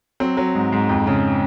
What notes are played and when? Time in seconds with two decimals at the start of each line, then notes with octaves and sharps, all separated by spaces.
0.20 F#3 C4
0.37 F#3
0.55 G#2
0.72 G#2
0.89 F2
1.07 C#3